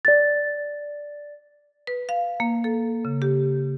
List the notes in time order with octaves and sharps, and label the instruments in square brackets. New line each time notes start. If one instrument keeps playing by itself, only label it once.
[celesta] D5 A6
[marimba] B4
F5
A#3
A4
C#3
G4